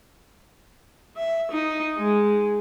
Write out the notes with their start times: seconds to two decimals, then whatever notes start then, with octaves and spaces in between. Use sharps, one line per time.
1.17 E5
1.52 D#4
1.98 G#3